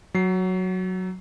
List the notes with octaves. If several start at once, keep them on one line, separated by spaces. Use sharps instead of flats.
F#3 C7